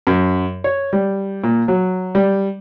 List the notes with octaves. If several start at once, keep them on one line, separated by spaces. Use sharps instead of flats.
F#2
C#5
G3
A#2
F#3
G3